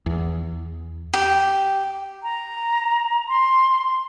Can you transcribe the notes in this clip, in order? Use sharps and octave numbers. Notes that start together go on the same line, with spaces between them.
E2
G4
A#5
C6